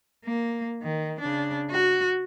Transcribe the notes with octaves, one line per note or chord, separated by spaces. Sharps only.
A#3
D#3
C#3 D4
F#4